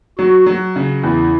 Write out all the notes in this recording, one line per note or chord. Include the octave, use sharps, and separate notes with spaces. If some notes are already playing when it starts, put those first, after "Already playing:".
F#3 F#4
F#3
C#3
E2 E4